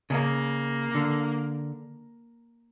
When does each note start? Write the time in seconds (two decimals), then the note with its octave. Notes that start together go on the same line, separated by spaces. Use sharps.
0.10 C#3 A#3
0.94 D3